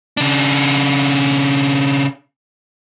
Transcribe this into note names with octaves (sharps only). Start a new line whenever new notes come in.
C#3 D4